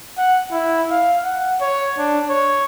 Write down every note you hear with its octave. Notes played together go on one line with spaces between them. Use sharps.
F#5
E4
F5
F#5
C#5
D4
C#5